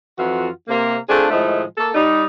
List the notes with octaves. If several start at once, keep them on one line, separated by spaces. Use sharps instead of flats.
F2 E3 F4 F#4
C3 A#3
A3 C4 D4 F4 G#4
A2 D#3 F3 G#3 A3
A#3 A4
G3 D#4